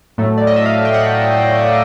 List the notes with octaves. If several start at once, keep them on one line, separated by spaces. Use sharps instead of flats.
A2 F#3 A3
D5
D#5
E5
F5
G5
F#5